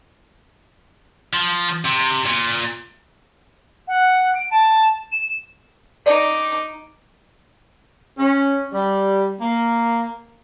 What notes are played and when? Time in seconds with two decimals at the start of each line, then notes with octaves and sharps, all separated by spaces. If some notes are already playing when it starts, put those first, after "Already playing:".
1.33 F3
1.85 C3
2.25 A#2
3.87 F#5
4.35 D7
4.51 A5
5.12 E7
6.06 D#4 D5 D6
8.18 C#4
8.73 G3
9.41 A#3